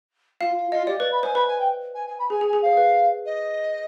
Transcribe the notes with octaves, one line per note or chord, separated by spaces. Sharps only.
F4 F5
F4
F4 D#5
G4 D5
B4 D5
B5
C5 G#5
B4 B5
G#5
G5
G#5
G#5
B5
G#4 G#5
G#4
G#5
G#4
C5 F5
G#4
B4
D#5